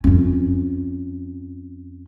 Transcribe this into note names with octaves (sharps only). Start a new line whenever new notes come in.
F2 C#4